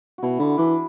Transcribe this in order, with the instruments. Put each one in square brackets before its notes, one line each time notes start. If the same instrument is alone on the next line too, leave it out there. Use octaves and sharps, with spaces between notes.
[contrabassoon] B2 [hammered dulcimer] E4 F#4
[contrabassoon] D3 [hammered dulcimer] E4
[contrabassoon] E3 [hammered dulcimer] D4